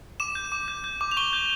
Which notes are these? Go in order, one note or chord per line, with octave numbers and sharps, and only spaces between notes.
D6 E7
G6
D6
G6
G6
D6
F7
C#6 G7
G6